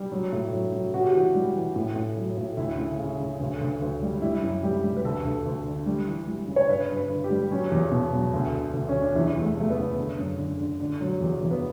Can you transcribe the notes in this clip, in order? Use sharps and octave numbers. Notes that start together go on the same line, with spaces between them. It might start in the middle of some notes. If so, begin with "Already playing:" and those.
Already playing: G3
F#3
A2
F#3
F#3
C#3 F#4
G4
E3 F#4
G3
E3
A2
A2
F#3
A2
D2 E4
C#3
C#3
C#3
D2
D2
D2
G3
G3 E4
F#2
G3 G4
G3
B4
D2 A4
D2
D2
D3
G3
E3
G3
C#3
C#5
G2 B4
G2
B4
D3
G4
G3
F#3 C#4
E2
B2
F#3
D2
D3
D2
C#4
D3
D4
E2 E4
E2
A3
E2 A3
B3
C#3
D3
F#2
D3
D3
D3
F#3
E2
E2
B3